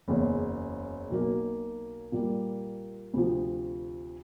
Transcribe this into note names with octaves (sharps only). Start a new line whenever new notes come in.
F#1 E2 C#3
B1 B2 F#3 A#3
A#2 G3 A#3
D2 C3 F3